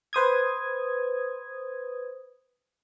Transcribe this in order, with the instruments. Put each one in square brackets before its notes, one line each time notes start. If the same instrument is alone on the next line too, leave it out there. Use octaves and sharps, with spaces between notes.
[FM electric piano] B4 C5 D#6 G#6